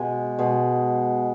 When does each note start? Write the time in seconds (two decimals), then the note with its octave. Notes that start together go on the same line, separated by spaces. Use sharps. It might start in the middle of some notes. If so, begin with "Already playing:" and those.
Already playing: B2 G#3 G#5
0.39 B2 G#3